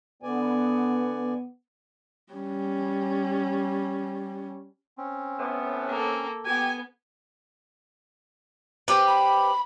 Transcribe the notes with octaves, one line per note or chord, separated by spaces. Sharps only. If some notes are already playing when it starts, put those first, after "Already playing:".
D3 B3 D5 G#5
G3 C#4
C4 C#4
A2 B3
A#3 A4
B3 G4 G#5
C4 G4 B4
B5